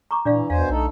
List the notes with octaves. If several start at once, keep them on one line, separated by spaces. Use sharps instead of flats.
A#5 C#6 D6
A#2 E3 D4 D5 F5
E2 B2 C5 F5 G#5
B1 A3 D#4 A4